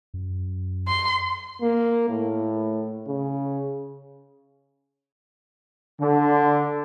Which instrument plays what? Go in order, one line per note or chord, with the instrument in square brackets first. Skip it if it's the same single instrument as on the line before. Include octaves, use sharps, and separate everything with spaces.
[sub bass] F#2
[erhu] C6
[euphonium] A#3
A2
C#3
[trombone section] D3